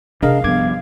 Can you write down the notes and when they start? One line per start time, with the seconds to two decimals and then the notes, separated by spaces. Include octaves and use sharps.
0.23 C3 D4 G#4 A#4 D#5 F5
0.44 G2 F3 B3 D6 G#6